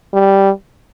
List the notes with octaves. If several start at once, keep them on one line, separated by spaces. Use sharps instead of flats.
G3